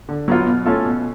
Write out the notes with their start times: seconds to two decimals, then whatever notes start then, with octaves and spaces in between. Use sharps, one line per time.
0.09 D3
0.28 F#3 B3 F4
0.47 B2
0.66 A3 C#4 F4 A4
0.85 B2